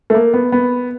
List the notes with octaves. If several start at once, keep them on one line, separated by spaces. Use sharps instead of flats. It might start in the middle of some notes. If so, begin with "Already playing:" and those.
A3
A#3
B3
B3